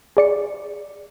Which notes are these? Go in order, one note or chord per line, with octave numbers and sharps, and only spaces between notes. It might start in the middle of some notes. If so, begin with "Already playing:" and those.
G#4 D5 C#7